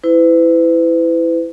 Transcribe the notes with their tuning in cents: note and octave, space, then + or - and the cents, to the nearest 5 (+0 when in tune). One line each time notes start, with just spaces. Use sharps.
E4 +0 B4 +40